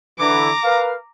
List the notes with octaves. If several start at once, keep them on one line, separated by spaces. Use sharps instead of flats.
D3 E3 A#5 D6
A#4 B4 F5